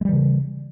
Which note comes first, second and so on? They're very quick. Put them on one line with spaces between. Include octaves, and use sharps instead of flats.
G#3 G3 E3 C#3